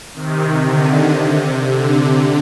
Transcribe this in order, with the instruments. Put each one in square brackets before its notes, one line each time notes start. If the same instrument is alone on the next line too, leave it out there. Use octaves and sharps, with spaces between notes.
[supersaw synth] C3 D#3
D3
C3
D3